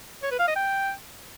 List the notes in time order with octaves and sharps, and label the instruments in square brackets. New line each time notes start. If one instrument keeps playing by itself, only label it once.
[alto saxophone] C#5
B4
F5
D#5
G5